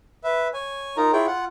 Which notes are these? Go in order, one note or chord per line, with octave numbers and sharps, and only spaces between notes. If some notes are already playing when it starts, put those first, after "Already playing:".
B4 E5
C#5 G#5
D#4 F4 A#4 A#5
E4 F4 G#4 C#5 G5
F4 F#5